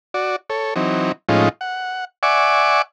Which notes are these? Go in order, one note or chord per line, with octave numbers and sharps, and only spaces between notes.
F#4 D5
A4 C#5
E3 F#3 C4 D#4
A2 F3 G#3 C#4 D#4 F4
F#5
D5 E5 F#5 G#5 C#6 D6